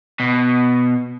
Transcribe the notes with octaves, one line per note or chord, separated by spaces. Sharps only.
B2